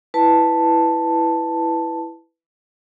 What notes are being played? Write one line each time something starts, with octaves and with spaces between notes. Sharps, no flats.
E4 B4 A5